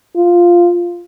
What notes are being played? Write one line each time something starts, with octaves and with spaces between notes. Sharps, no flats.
F4